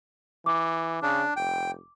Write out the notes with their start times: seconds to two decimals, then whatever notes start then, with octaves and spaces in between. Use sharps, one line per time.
0.46 E3 D6
1.02 C#3 D4
1.37 F1 G5